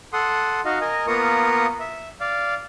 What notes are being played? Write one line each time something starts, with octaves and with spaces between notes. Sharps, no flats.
A4 F#5 C6 D#6
D#4 F#4 D#5 F5
A#4 D#5 G#5
A#3 B3 F4 A#4 C#6 D#6
E5
D5 F5